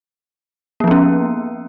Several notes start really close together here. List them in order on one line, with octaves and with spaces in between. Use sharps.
A#3 F3 B3 C#4